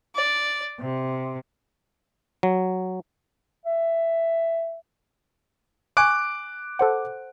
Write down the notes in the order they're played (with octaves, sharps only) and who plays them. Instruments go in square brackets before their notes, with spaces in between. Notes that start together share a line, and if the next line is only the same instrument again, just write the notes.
[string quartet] D5
C3
[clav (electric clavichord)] F#3
[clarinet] E5
[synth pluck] G#5 C#6 [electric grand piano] D6 F#6 D7
[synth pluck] A4 C5 F#5